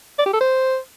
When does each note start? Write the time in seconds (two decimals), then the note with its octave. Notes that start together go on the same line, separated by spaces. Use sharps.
0.18 D5
0.26 G4
0.33 A4
0.41 C5